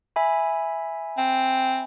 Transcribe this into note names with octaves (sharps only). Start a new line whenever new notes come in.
E5 G#5 B5
C4